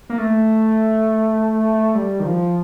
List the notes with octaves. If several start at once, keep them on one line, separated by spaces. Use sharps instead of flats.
A#3
A3
G3
D#3
F3